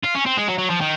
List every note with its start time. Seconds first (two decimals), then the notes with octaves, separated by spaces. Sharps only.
0.04 F4
0.15 C#4
0.26 C4
0.37 G#3
0.48 F#3
0.58 F#3
0.70 F3
0.81 D#3